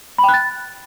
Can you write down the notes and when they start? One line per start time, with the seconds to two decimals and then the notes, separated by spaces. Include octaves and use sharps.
0.18 B5
0.24 G5
0.29 F#6
0.34 A6